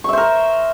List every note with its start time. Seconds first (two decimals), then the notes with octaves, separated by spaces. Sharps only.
0.04 C#6
0.09 E5
0.13 C5
0.18 A#4